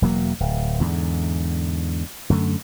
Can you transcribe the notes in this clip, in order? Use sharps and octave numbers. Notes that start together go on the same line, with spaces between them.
E1 F#3 A#3
D1
E2 G#2 D3
F#2 D3 A3